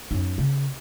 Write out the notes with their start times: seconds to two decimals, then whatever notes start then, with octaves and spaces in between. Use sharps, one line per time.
0.11 F#2 D#4
0.38 C#3